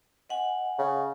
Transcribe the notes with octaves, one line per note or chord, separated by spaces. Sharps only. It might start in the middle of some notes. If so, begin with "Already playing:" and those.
D#5 F#5 G#5
C#3